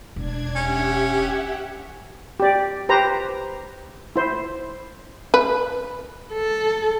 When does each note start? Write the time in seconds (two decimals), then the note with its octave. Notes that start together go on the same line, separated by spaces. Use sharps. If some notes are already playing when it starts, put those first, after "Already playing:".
0.16 E1 D4 G#6
0.56 C#4 G4 E5 F#5
2.40 G4 D5
2.89 G4 B4 C5 A#5
4.16 E4 C5
5.34 B4
6.33 A4